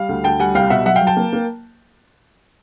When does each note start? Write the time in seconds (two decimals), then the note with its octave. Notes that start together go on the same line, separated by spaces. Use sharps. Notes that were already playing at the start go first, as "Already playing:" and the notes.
Already playing: G3 F5
0.09 D2
0.24 D2 G5 A5
0.40 G3 F#5 G#5
0.55 C2 F5 G5
0.70 B2 E5 F#5
0.85 F#3 E5 F#5
0.96 F5 G5
1.01 F#3
1.07 G5 A5
1.17 A#3
1.33 A#3